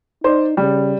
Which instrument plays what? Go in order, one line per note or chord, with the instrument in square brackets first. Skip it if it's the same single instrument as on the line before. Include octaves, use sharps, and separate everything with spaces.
[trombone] D#4 [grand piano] C5 D5
[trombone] C#3 [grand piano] G3